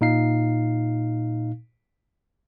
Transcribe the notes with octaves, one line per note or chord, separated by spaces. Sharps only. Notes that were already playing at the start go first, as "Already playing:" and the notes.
A#2 D#4 F5 C7